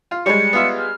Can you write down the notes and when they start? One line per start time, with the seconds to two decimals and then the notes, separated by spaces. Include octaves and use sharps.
0.11 F4
0.26 G3 G#3 C#5 C#7
0.53 B3 F4 E5
0.79 F6